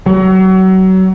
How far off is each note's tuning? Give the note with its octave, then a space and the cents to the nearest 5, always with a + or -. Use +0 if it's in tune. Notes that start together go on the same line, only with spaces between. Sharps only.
F#3 +30